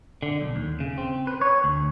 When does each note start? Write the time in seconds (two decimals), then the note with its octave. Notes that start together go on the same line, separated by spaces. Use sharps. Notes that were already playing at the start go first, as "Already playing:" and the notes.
0.23 D3
0.41 B1
0.56 D#2
0.80 C#3
0.98 C4
1.27 B4
1.41 C#5
1.64 D2